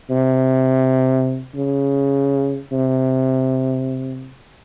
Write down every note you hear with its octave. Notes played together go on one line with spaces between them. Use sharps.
C3
C#3
C3